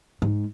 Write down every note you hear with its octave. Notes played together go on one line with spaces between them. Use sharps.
G#2